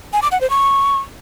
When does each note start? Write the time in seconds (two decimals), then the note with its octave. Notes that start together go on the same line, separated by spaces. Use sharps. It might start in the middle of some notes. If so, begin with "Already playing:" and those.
0.13 G#5
0.22 D6
0.32 F#5
0.41 C5
0.50 C#6